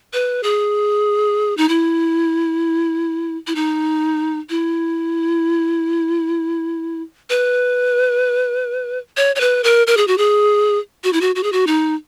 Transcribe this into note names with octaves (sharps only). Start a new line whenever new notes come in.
B4
G#4
D#4
E4
E4
D#4
E4
B4
C#5
C#5
B4
A#4
A#4
G#4
F#4
G#4
F#4
E4
F#4
F#4
G#4
F#4
D#4